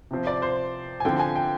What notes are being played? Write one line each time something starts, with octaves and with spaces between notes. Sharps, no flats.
C3 F3 C4
D5
C5
G#5
D3 F3 C4 G5
G#5
G5